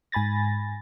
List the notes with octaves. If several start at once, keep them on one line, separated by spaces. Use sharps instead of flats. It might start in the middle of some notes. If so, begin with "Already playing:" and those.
G#2 G#5 B5 A6 A#6